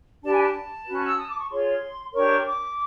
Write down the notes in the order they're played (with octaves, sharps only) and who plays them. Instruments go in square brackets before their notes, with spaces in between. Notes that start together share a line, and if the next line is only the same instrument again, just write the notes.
[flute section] D4 G4 B4 A5
G#5
A5
C#4 F#4 B4
E6
D#6
D6
C#6
F4 G#4 C#5 C6
D4 G4 A#4 C#5 C#6
C#6
D6